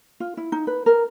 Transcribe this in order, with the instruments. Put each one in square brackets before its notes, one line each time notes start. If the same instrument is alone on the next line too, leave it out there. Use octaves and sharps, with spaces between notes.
[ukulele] F4
E4
D#4
B4
A#4